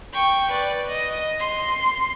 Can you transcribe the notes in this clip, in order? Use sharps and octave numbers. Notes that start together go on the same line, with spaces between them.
G5 C#6
B4 D5
D#5
C6